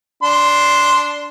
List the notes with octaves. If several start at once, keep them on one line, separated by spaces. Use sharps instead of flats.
D4 C6